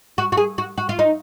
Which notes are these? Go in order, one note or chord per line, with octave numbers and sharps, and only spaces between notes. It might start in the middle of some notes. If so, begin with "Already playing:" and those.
F#4
F#4
G#4
F#4
F#4
F4
D#4